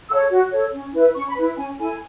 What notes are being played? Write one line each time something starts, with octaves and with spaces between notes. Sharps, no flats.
A4 C#5 E6
F#4
A4 C#5
C#4
E4 B4
C#4 C#6
B5
E4 B4
C#4 G#5
E4 A4 G#5